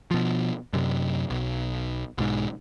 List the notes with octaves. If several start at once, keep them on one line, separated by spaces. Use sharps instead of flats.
B2 F3
F#2 C3
B1
B1 G#2